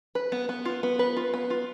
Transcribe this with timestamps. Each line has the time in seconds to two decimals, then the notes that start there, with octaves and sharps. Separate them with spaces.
0.15 B4
0.32 B3
0.49 B3
0.65 F4
0.83 B3
0.99 B4
1.17 F4
1.34 B3
1.50 F4